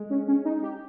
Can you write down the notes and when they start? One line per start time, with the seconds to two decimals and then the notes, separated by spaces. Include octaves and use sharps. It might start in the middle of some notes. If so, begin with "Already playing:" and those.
Already playing: G#3
0.10 C#4
0.28 C#4
0.45 D#4
0.63 G4